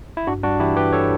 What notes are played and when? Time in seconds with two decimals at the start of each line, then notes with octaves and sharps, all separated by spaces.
0.17 E4
0.27 G2 D4 F#4
0.43 G2 D4 F#4
0.60 E3 E4 G4
0.76 G3 G4 B4
0.93 A4 C#5